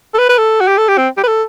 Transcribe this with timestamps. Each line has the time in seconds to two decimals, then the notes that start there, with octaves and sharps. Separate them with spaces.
0.14 A4
0.18 B4
0.29 B4
0.38 A4
0.61 F#4
0.68 G4
0.78 A4
0.89 G4
0.98 C4
1.17 G4
1.24 B4
1.28 A4